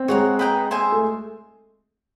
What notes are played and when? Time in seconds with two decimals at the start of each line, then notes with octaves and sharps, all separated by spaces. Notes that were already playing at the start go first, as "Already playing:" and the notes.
Already playing: C4
0.08 G#3 C#5 F#5 A#5
0.39 B4 D#5 G5 A#5
0.71 C5 E5 G#5
0.92 A3